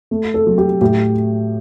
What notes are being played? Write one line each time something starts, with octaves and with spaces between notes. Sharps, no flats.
A3
A4
F#3
G4
A2 G4